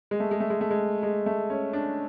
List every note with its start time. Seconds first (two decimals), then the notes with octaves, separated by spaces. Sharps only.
0.11 G#3
0.20 A3
0.31 G#3
0.40 A3
0.50 G#3
0.61 A3
0.71 G#3
1.03 G#3
1.26 A3
1.50 C#4
1.73 D4